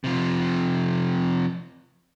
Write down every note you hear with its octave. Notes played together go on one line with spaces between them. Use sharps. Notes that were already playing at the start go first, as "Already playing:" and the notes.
C3 F3